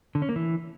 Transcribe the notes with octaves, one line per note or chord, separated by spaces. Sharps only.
D3
C#4
A#3
E3